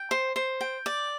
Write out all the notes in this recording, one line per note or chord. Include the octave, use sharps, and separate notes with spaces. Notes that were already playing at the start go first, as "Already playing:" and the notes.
Already playing: G5
C5
C5
G5
D5